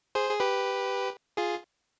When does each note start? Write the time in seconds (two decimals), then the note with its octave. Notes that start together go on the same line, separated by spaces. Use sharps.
0.15 G#4 C5
0.30 G#4
0.40 G4 B4
1.37 F4 G#4